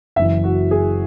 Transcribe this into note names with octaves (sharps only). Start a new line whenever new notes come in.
F#1 F#2 E3 E5
F#4
G#4